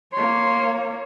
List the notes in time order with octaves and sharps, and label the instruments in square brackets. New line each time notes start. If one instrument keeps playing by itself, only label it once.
[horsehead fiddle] A#3 C#5 [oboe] C6